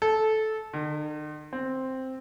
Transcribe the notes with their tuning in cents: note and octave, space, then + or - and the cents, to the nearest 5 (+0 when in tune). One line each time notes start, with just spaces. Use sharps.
A4 -15
D#3 -45
C4 +0